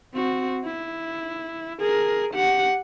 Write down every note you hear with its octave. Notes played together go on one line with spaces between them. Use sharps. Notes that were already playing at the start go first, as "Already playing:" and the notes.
C4 F#4
E4
G#4 A#4
G4 F#5